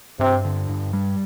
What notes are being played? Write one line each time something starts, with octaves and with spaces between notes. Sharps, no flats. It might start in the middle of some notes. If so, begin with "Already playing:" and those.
G2 C3
D3
G2
G3